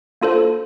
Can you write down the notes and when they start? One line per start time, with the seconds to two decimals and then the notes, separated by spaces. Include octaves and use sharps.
0.21 A#3 D4 F4 A4 C5